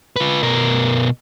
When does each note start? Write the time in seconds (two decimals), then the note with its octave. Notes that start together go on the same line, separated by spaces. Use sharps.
0.16 F4 B4
0.43 B2 A#4